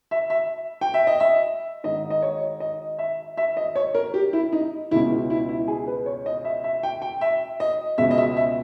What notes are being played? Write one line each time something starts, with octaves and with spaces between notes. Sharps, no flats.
E5
E5
G5
E5
D#5
E5
G#2 D#3 D#5
D#5
C#5
D#5
E5
E5
D#5
C#5
A#4
G4
E4
D#4
C#2 B2 E4
E4
E4
G#4
B4
C#5
D#5
E5
E5
G5
G5
E5
D#5
C#2 B2 E5
D#5
E5
E5